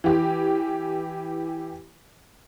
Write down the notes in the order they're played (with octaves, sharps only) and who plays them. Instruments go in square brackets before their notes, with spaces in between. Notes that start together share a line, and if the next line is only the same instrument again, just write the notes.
[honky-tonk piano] E3 G4